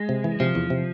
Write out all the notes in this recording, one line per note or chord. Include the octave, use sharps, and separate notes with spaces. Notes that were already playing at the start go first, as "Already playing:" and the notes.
Already playing: G#3
C3
E3
C3 F3
E2
C3